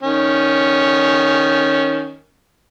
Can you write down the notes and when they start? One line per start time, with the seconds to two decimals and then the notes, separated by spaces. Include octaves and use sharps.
0.03 D#3 C#4